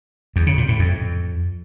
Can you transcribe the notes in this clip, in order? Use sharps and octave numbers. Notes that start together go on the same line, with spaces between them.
E2
C#3
A#2
A2
F2